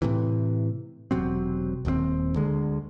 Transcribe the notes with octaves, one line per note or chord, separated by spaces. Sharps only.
A2 C3 E3
E1 C3 F#3 C4
D#1 D#2 F3 C4
D2 D3 G#3